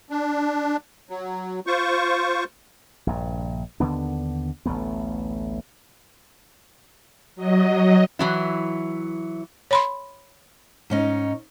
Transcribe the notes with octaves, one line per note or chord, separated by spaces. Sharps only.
D4
F#3
F4 C5 C#6
A#1 G2
D#2 D3 B3 D4
A1 D2 A3 B3
F#3 D#5
E3 F#3 E4
C#5 B5 C6
G#2 C#4 D#4